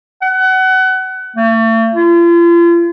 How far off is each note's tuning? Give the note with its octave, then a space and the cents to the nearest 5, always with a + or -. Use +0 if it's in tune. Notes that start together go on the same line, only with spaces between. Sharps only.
F#5 +25
A3 +40
F4 -40